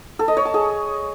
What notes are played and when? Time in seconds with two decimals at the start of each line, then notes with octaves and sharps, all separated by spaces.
0.19 A4
0.28 D#5
0.37 C#5
0.45 A5
0.54 G#4